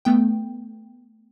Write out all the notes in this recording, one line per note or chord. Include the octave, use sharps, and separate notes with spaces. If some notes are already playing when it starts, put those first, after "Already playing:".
A3 B3 G5